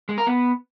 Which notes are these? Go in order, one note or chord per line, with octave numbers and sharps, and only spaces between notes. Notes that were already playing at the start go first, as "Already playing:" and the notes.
G#3
A#4
B3